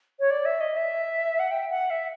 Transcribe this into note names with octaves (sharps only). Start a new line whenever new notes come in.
C#5
D5
E5
D#5
E5
F#5
G5
F#5
E5